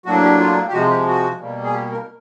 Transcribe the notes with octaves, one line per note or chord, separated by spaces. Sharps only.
A2 F#3 A#3 D4 F#4
G4
F4
G4
C3 F3 G#3 F#4
G4
F#4
B2 G3 A#3
G#4
G4
A#4